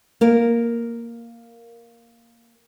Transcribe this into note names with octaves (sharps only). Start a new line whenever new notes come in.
A#3 A#4